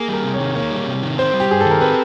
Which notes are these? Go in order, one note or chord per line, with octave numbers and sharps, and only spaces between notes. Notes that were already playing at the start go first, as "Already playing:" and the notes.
Already playing: A#3 G#4
G3 A#4
C3
C#5
D#3
A#3 C#5
G3
C3
D#3
C4 C5
G3
G4
G2 G#4
D#3 A4
A#4
C4 B4